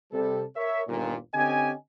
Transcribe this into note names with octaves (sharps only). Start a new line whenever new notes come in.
C3 G3 A4
A#4 C#5 E5
G1 D#2 A#2
D3 C4 C#4 G4 D#5 G#5